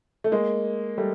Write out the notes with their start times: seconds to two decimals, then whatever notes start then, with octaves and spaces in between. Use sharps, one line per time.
0.24 A3
0.32 G#3 A#3
0.97 G3 A3